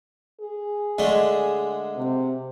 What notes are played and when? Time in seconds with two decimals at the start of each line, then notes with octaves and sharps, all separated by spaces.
0.41 G#4
0.98 D3 G#3 A3
1.96 C3